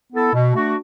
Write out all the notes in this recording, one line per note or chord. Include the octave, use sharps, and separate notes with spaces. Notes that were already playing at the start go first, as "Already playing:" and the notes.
B3 E4 A4
B2
A3 D4 F#4